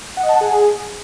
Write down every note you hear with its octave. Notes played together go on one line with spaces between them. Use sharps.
F#5
D#5
A5
F#5
G#4